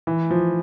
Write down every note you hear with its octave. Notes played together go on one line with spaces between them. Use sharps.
E3
F3